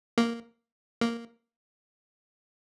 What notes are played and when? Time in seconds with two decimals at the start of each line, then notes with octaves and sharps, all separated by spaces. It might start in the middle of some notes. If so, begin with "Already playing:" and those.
0.18 A#3
1.01 A#3